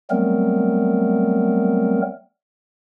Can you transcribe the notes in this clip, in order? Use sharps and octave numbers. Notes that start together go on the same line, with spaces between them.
F#3 G3 A3 B3 C4 A#4